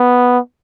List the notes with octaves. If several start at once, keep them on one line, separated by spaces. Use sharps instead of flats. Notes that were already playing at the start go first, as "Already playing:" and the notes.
Already playing: B3